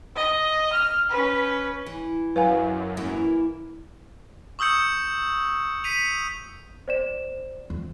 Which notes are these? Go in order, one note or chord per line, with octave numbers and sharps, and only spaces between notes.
D#5
F6
C#4 B4
E3
F#2 B4 F5 G#5
E3 A#3
C#6 D#6 E6 G6 C#7
B6 C#7 D#7 F7
C5 D5 E7
F2